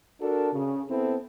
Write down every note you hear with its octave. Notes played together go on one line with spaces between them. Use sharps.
D4 F#4 A4 A#4
C#3
B3 C4 E4 A4